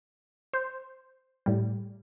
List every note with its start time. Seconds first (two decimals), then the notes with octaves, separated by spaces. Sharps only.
0.53 C5
1.46 A2 G3